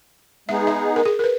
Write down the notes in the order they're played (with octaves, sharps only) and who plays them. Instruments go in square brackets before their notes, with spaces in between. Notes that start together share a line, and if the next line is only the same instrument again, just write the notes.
[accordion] G#3 B3 D#4 G#4 [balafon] E5
[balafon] E5
A#4
G#4
A#4
B4